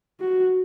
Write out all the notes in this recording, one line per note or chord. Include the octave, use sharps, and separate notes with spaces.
F#4